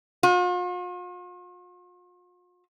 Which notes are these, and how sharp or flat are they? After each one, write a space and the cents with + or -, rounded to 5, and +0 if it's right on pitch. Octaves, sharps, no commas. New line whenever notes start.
F4 +45